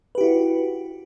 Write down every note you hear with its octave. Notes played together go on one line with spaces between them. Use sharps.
E4 F#4 G4 B4